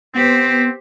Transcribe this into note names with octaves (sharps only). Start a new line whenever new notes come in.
B3 C4 G4 C5